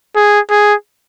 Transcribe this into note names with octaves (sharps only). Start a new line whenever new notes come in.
G#4
G#4